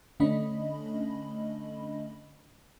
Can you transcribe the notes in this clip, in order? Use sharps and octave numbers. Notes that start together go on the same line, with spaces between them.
D3 A3 C#4 D4 D#5 B5